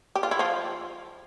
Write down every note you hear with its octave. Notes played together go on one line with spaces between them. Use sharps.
G4
F4
E4
F3 F4